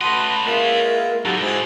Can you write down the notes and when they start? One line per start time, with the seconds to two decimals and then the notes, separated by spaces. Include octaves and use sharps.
0.01 A3 C#4 F#4 B4 D#5 A5 B5 C6
0.45 G#3 A#3 B3 F4 A#4 E5
1.25 A2 D3 F#3 D#4 F#4 G4 A4
1.41 G#3 E4 F#4 G#4 C5